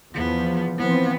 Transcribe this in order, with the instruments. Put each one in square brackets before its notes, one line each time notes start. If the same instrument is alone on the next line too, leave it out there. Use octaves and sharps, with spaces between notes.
[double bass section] E2 F3 [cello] B3
[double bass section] E3 F3 C4 [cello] B3